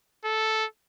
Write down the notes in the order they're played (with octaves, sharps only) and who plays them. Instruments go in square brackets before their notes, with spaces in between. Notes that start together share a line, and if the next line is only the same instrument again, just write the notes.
[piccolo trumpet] A4